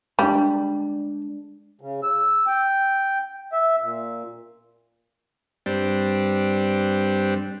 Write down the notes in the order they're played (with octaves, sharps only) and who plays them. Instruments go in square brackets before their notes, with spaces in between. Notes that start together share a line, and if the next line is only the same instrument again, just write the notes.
[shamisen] G3 [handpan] G#3 D4
[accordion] C#3
E6
G5
E5
A#2
[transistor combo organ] G2 G3 C4 D4